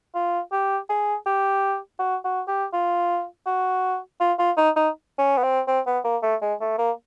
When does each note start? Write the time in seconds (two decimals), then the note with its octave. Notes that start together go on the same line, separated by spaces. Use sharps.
0.14 F4
0.52 G4
0.89 G#4
1.26 G4
1.99 F#4
2.24 F#4
2.48 G4
2.73 F4
3.46 F#4
4.20 F4
4.39 F4
4.57 D#4
4.76 D#4
5.18 C#4
5.38 B3
5.44 C4
5.68 C4
5.86 B3
6.04 A#3
6.23 A3
6.42 G#3
6.61 A3
6.78 A#3